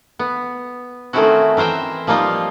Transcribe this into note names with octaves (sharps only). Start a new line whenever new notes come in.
B3
D#3 A3 C4 C#4 E4 F#4
E3 A#4 C5 E5 G5
F3 G3 A#3 D#4 F4